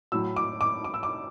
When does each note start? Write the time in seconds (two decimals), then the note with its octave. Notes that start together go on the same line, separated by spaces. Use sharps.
0.12 A2 F#3 E6
0.36 D6
0.61 D6
0.84 D6
0.94 E6
1.03 D6